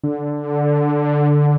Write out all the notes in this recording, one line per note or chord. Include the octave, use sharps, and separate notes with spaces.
D3